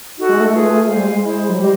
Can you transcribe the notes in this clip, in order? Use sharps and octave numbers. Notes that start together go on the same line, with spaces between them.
D#4 F#4 A4
G#3
A3
F4 G#4 B4
G#3 C5 F5 G#5
G3
G#3
E4 G#4 C5
F#3
G3 G4 C5 D#5